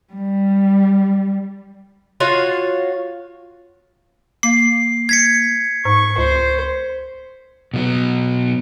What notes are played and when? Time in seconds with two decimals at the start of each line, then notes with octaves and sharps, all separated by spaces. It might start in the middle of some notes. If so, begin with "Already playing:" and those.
0.13 G3
2.20 F4 F#4 C#5 F5
4.43 A#3 C7
5.09 G#6 B6 C#7
5.85 G#2 C#6
6.18 C#2 C5
7.74 B2 F#3 B3